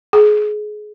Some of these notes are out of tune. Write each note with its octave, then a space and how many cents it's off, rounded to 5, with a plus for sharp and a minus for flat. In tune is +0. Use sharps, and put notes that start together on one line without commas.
G#4 +25